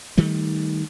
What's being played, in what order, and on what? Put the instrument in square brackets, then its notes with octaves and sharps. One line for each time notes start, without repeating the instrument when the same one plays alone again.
[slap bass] D#3 G3 A3